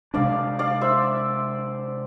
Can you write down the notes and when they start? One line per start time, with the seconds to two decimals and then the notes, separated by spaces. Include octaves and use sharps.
0.14 C3 G#3 D4 D5 F5
0.59 D5 F5
0.81 C5 E5